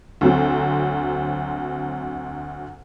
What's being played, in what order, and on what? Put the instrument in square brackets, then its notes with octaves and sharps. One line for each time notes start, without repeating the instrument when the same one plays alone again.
[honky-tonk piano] D2 F#3 C4